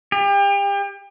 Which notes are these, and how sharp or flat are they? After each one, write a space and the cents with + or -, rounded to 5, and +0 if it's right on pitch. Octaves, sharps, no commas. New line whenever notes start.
G4 +35